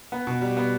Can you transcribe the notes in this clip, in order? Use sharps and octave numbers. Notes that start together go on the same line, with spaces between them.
B3
B2
G3
B3